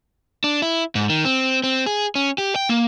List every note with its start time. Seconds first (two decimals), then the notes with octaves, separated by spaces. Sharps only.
0.44 D4
0.62 E4
0.95 G#2
1.09 D#3
1.25 C4
1.64 C4
1.86 G#4
2.15 C#4
2.38 G4
2.56 G5
2.69 A#3